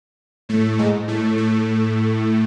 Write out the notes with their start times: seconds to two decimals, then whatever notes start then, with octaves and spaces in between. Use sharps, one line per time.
0.49 A2 A3
0.79 G#2 G#3
1.08 A2 A3
1.38 A2 A3